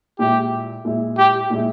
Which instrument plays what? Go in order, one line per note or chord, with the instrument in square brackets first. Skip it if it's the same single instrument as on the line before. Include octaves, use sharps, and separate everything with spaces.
[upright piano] A#2 G#3 E4 [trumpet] G4
[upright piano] A#2 G#3 E4
[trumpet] G4
[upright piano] A#2 G#3 E4